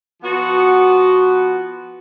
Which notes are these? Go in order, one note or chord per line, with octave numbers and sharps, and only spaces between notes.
F3 B3 F#4